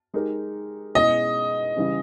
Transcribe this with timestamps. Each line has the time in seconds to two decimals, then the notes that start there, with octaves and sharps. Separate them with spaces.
0.14 G#3 D#4 G4 A#4
0.95 B2 G#3 C#4 E4 G#4 D#5
1.77 C#3 E3 G3 C#4